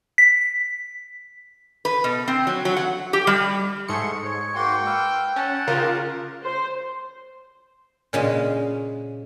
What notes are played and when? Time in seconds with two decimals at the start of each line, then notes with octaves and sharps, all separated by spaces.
0.18 B6
1.85 B4
2.04 B2
2.28 C4
2.47 F#3
2.65 F#3
2.77 F#5
3.13 G4
3.27 G3
3.88 G#2 A3 G#4 C6 C#7
4.25 C#5
4.55 A#3 F#4 G5 C6
4.86 B4 F5 E6
5.36 C#4 F#5 A5
5.68 C#3 D#4 F4 G4 A#4
6.43 C5
8.13 A#2 C#3 G#3